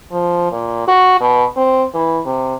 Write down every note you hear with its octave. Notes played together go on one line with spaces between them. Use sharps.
F3
A#2
F#4
B2
C4
E3
C3